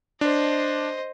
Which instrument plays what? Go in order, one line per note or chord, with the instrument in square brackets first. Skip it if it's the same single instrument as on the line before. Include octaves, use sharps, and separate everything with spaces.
[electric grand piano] D4 [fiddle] C5 D#5